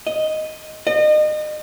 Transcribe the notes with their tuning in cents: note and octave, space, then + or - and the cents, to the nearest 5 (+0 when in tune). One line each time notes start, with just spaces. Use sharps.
D#5 +0
D#5 -35